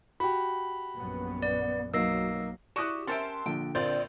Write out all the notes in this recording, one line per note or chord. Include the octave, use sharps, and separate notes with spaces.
F#4 G4 B5
A#1 F#2 B3
D5
B1 F#3 A#3 D#4 E6 A#6 C7
E4 F#4 G4 D5 C#6 D#6 F#6 E7
C#4 A#4 C5 E5 G5 A5 C6 A6
A#1 D3 G5
A#1 A#3 C4 F4 D5 G6